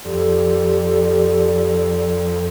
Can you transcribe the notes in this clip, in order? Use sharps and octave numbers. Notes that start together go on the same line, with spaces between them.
F2 G4 A4 D5